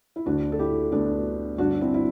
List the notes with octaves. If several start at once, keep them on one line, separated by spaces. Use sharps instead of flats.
E4
D2 D3 D4 F#4
A4
E4 G4
D2 D3 B3 D4
G1 G2 D3 D4 F#4
C4 E4
E4